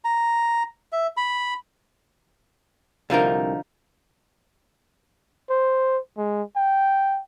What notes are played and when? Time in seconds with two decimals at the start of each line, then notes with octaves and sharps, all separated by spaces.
0.04 A#5
0.92 E5
1.17 B5
3.10 C2 D3 F3 D#4 A#4
5.50 C5
6.17 G#3
6.56 G5